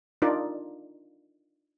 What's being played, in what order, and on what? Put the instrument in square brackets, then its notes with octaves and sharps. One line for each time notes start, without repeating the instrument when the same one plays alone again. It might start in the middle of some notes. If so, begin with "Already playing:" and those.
[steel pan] D4 D#4 F4 A#4 D5